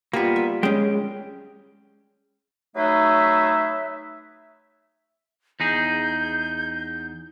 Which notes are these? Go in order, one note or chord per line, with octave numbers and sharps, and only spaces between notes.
G3 A#3 B3 F4
E5
G#3 C#4 G5
F#3 A3 D#4 G#4 B4 E5
E2 D#4 G#4 G6